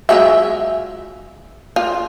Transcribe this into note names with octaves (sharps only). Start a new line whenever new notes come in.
F#3 G#3 F4 E5
F4